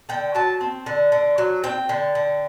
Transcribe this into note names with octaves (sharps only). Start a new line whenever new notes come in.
D3 G5
F#3 A5
C4
D3
D3
F#3
C4 G5
D3
D3